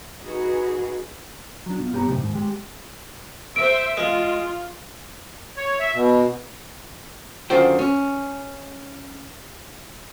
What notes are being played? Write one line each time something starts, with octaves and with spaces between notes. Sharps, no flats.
D#4 F#4 G#4 B4
F#3 D4
B2 F4
G2 B3 G4 C#5 A#5
F#2 A2 C3 D#4
D#2 G#2
G#3 G4
C5 E5 D7
G#3 F4
C#5
E5
B2
F#2 D3 D#3 F4 C5 G5
C#4